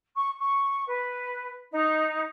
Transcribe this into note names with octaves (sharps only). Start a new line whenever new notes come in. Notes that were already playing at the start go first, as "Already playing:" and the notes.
C#6
C#6
B4
D#4